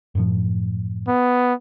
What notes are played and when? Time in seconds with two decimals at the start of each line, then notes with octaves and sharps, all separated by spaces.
0.15 F#2 A2 F3
1.07 B3